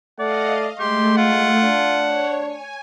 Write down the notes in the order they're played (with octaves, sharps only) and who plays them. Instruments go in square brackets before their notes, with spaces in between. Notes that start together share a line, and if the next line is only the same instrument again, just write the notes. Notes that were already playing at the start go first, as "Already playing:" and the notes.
[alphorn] A3 [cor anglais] D5 [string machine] D#5 F5 [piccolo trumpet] F#5
[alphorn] G#3 [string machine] A3 [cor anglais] G4 [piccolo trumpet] C6
[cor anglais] F4 [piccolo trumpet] F#5
[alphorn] D4
[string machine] C#5
G#5